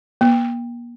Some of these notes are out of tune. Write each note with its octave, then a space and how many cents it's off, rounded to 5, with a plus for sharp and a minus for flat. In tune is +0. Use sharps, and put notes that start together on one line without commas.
A#3 +40